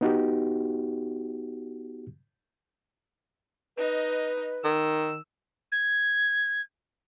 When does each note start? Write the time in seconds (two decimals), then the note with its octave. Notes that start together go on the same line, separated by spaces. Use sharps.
0.01 B3 D#4 F#4 G4
3.77 D#4 B4 D#5
4.64 D#3 E6
5.72 G#6